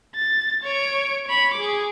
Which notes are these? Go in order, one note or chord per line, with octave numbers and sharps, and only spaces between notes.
A6
C#5 D7
C#5 B5
G#4 D6